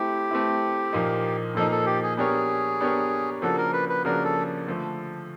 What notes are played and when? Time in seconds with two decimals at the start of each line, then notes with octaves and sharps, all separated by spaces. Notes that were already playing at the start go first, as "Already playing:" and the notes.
Already playing: A3 C4 E4 G4
0.31 A3 C4 E4
0.93 A#2 F3 A#3 D#4
1.55 A#2 F3 A#3 D#4 A4
1.71 A4
1.86 G4
2.02 G#4
2.17 B3 D4 G4 G#4 A#4 C#5
2.80 B3 D4 G4 A#4 C#5
3.42 C#3 F3 A#3 D4 F#4 A4
3.57 A#4
3.73 B4
3.89 B4
4.05 C#3 F3 A#3 D4 F#4 A#4
4.25 A4
4.67 D3 F3 A3